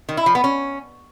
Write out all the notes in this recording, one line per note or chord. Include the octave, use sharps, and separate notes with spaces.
D#3
E4
F3
B3
C#4